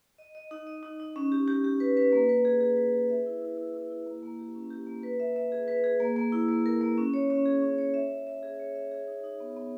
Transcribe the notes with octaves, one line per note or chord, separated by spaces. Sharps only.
D#5
D#5
D#4
D#5
D#4
D#4
C#4
G4
G4
G4
B4
B4
A#3
B4
G#4
G#4
B4
G#4
E5
E4
E4
E4
E4
E4
A#3
A#3
G4
C#4
G4
A#3
B4
E5
E5
G#4
B4
G#4
A#3
A#3
E4
A#3
A#4
A#3
C#4
C#5
C#4
G#4
C#4
C#5
E5
C#5
E5
G#4
C#5
E5
G#4
D#4
D#4
B3
B3